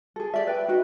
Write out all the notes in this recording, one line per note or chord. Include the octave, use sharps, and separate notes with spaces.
G#4 A4
G4 D5 E5
B4 G5
D#4 F#4 B4 D#5